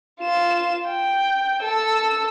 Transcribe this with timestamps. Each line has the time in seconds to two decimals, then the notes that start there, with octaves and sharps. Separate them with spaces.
0.21 F4 E7
0.86 G5
1.63 A4 E6